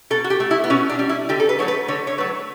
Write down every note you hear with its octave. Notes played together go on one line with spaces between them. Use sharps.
B2 A4
F#4
G4
A3
E4
B3
B2 C#4
D4
G3
E4
D3 G4
A4
B4
F#3 A3 C#5
B4
D3 C#5
C#5
F#3 A3 B4